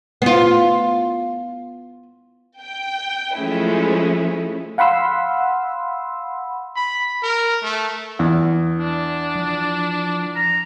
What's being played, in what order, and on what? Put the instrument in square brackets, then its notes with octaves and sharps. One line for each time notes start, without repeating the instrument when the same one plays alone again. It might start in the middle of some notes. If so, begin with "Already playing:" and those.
[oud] B3 F4
[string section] G5
F3 F#3 G#3 A3 C#4 E4
[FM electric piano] F5 F#5 B5 C6 E6
[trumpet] B5
A#4
A3
[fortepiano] E2
[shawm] D4
[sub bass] F3
[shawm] A#5